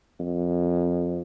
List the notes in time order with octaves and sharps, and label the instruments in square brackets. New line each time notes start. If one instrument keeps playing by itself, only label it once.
[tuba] F2